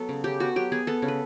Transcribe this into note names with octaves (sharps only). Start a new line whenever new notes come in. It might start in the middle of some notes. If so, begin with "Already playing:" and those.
Already playing: F#3 B3 A4
C#3
C#3 G4
B3 F#4
F#3 G4
B3 G#4
B3 A4
C#3
B4